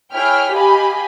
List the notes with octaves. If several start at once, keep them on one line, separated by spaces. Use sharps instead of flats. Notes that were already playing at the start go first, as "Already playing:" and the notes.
E4 G#4 C#5 G5 F6 B6
G4 D#5 F5 G#5 B5